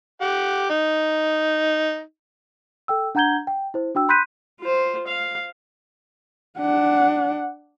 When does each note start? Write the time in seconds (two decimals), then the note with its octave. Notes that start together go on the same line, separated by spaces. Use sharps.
0.21 G4 F#5
0.70 D#4
2.88 A4 G5 E6
3.15 D4 F#5 A#5 G6 G#6 G7
3.47 G5
3.74 E4 C5
3.95 D4 F#4 G5 E6
4.09 B5 C6 F#6 G6 B6 D#7
4.60 F4 C5
5.07 F5
6.58 D4 F#5